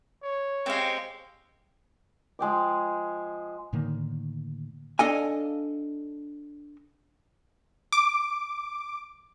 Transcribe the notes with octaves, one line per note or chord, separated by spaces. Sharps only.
C#5
G#3 C4 G4 F5
F3 G#3 G5 D6
A2 D3 D#3 A#3
D4 A4 D#5 F5 G#5
D6